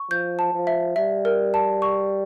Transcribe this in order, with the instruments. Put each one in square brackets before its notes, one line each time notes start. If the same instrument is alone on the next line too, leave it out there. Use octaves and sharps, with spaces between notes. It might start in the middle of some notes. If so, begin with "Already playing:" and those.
Already playing: [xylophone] C#6
[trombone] F3 [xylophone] G6
[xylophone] A5
[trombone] F3
[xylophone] E5
[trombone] G3 [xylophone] E5
[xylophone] A#4
A5
C#6